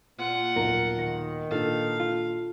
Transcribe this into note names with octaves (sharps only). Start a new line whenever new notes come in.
A#2 F4 F#5
D#1 B1 A#4
D#3 A#6 C#7
A#2 D4 F4 A4 F5
F4